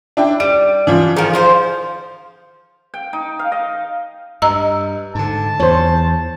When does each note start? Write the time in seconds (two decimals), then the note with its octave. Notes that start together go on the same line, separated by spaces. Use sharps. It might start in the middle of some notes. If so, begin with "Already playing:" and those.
0.17 D4 E4 G5
0.40 G3 D7
0.87 E3 F3 F4
1.17 D#3 F3 G#4
1.33 F3 F4 C5
2.94 G5
3.13 D#4
3.39 F5
3.52 D#5
4.42 G2 D#5 A#5 E6
5.15 G#2 D3 A5
5.60 E2 C5 C#5